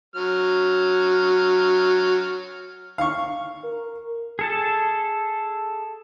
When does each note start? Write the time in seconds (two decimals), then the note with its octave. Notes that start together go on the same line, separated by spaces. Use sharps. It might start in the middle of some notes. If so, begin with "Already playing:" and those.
0.16 F#3 F6
2.98 F5 C#6
3.64 A#4
4.39 G#4 A4 A5